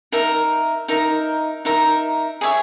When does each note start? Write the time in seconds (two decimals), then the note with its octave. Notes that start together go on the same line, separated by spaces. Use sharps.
0.12 D#4 A#4 E5 A#5
0.88 D#4 A#4 E5 A#5
1.65 D#4 A#4 E5 A#5
2.41 G#4 C#5 E5